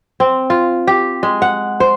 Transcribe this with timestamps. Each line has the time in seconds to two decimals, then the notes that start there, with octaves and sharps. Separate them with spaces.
0.20 C4
0.50 F4
0.87 G4
1.23 G#3
1.42 F#5
1.80 C5